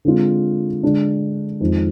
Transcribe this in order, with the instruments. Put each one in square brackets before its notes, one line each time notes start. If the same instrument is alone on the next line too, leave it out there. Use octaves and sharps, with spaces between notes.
[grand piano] D3 G#3 C4 F4
D3 G#3 D4
F2 D#3 G#3